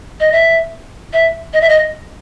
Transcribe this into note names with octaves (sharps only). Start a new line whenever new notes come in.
D#5
E5
E5
D#5
E5
D#5